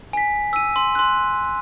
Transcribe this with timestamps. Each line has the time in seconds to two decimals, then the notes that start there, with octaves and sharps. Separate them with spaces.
0.13 G#5 B6
0.53 E6 D#7
0.76 C6
0.95 C6 F#6